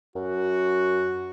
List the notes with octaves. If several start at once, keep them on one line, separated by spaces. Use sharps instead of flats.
F#2 F#4